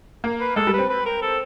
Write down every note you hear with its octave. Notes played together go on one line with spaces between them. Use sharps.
A#3
B4
G#3 A4
G3
B4
C4
B4
A#4
A4